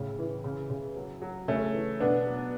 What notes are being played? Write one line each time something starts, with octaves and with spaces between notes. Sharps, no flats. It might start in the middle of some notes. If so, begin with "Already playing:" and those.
Already playing: A2 C#3
E3
C#3
C#3
F#3
F#3
C#3 A3 C#4
E3
B2 B3 D4
F#3